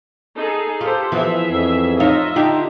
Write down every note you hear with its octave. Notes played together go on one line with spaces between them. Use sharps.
D#4 G#4 A4
F4 G4 A4 C5
E3 F3 B3 G#4 E5
F2
D#4 F4 C#5 D#5 E5
D3 D4 D#4 F4 G4